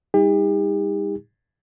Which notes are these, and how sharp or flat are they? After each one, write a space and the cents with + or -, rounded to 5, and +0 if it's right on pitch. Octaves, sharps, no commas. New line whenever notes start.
G3 +35 D#4 +30 G4 +40